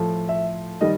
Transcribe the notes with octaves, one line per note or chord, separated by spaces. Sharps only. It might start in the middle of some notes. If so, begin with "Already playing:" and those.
Already playing: A2 F3
E5
D#3 G3 D#5